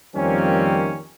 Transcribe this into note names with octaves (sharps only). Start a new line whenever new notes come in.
F2 D#3 G3 A#3 C4 C#4